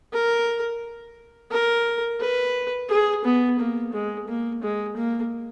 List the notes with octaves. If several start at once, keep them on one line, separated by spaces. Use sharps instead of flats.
A#4
A#4
B4
G#4
B3
A#3
G#3
A#3
G#3
A#3